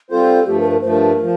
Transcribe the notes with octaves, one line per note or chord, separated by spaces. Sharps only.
G3 C4 F4 A4 C5
G2 F3 A3 G4
A#4
A#4
G2 F3 A3 C5
A#4
F3